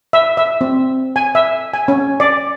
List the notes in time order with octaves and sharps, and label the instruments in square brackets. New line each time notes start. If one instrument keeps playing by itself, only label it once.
[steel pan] E5
E5
C4
G#5
E5
G#5
C#4
D5